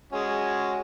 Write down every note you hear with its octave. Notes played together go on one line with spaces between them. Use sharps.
G#3 C#4 F#4